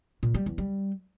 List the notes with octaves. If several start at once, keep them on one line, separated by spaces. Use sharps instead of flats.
A#2
G3
E2
G3